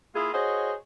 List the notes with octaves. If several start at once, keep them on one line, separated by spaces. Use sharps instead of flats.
A#3 E4 F4 G#4
F#4 G#4 C5 C#5 D#5